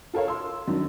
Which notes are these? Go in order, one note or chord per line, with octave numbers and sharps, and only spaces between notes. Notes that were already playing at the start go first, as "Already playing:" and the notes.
F4 A4 A#4 C#5 F5
C6 E6
F#2 D#3 D4